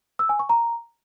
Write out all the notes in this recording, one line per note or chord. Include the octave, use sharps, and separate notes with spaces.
E6
G#5
C#6
A#5